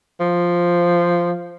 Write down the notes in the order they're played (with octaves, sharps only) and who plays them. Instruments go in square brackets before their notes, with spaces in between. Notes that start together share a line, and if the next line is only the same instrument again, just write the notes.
[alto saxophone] F3